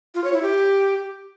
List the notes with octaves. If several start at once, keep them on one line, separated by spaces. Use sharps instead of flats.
F4
C#5
E4
G4